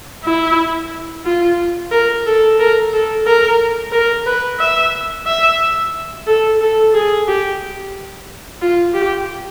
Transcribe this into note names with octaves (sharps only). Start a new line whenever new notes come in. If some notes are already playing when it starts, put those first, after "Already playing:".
E4
F4
A#4
A4
A#4
A4
A#4
A#4
B4
E5
E5
A4
A4
G#4
G4
F4
G4